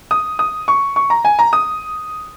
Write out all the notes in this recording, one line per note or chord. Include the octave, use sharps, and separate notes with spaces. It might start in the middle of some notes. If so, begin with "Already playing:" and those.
D#6
D#6
C#6
C#6
A#5
G#5
A#5
D#6